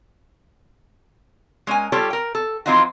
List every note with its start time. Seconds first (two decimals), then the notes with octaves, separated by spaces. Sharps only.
1.67 G#3 C#4 A#4 G#5
1.92 G3 F4 G4 A4 C#5
2.10 A#4 G5
2.35 A4
2.66 E3 F3 C4 D#4 F4 F#4